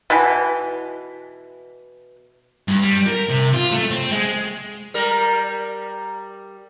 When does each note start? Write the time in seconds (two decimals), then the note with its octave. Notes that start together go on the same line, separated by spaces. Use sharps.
0.10 B2 E3
2.68 G2
2.82 G3
3.07 A#4
3.30 C3
3.54 F4
3.72 A3
3.91 C4
4.11 G#3
4.94 G3 A#4